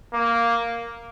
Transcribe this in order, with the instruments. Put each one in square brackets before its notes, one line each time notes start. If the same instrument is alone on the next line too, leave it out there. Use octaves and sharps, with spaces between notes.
[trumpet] A#3